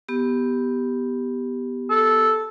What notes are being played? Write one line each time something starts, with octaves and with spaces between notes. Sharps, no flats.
B3 G4
A4